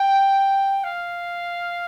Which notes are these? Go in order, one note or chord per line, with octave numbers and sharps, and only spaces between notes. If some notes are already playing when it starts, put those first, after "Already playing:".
Already playing: G5
F5